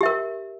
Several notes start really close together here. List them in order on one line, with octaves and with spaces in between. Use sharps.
G4 E5 A#4